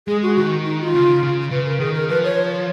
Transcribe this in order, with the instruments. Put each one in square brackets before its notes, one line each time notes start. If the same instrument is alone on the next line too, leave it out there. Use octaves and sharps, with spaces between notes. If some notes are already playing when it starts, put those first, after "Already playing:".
[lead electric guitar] G#3 [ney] G#4
[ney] F#4
[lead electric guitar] D#3 [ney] F#4
[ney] D#4
F4
[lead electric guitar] C#3
C#3
[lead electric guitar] C#3 [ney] B4
[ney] A#4
[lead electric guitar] D#3 [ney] G#4
[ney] A#4
[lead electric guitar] F3 [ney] B4
[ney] C#5